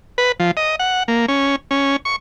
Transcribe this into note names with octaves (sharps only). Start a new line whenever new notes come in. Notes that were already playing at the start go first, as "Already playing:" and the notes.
B4
F3
D#5
F#5
A#3
C#4
C#4
C#6